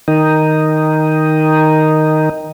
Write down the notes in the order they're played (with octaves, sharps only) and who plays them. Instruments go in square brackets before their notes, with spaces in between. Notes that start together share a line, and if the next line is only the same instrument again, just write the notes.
[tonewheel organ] D#3 D#4